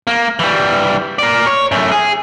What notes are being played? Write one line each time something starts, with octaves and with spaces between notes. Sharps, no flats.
A#3
E3 G3
A#4 D5
C#5
F#2 A3
G#4